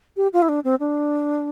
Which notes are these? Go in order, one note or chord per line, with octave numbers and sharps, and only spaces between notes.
G4
F4
E4
D4
C4
D4